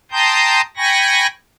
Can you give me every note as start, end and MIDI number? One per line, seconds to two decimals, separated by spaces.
0.12 0.61 79
0.12 0.61 81
0.12 0.61 82
0.12 0.61 84
0.12 0.61 87
0.12 0.61 91
0.77 1.27 79
0.77 1.27 80
0.77 1.27 83
0.77 1.27 85
0.77 1.27 94